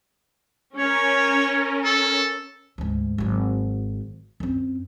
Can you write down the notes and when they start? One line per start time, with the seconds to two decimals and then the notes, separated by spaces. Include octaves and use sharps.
0.78 C#4 A#4 C#5
1.84 A4
2.78 D2 G#2
3.18 G#1 F#3
4.40 F#2 C4